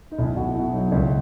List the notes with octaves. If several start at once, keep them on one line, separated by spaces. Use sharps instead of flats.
D#4
B1 E4
B1 E4 F#4
B2 E4
F#3 D#4
C#2 E4